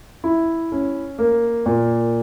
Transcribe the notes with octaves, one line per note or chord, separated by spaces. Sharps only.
E4
C#4
A#3
A#2